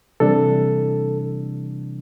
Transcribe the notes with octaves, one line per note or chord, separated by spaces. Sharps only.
C3 E3 G3 D4 A4